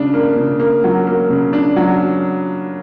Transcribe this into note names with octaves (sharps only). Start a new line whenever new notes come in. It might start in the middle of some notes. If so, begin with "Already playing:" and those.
Already playing: C#3 D4
A#3
C#3
A#3
F#3
A#3
C#3
D4
F#3